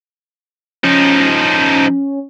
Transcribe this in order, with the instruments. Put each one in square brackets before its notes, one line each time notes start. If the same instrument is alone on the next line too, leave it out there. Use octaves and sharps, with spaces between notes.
[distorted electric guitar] F3 D#4 [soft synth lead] C#4